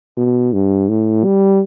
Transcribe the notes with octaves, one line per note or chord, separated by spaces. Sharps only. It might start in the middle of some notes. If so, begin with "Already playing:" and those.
B2
G2
A2
G3